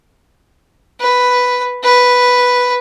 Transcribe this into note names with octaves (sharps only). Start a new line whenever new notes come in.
B4
B4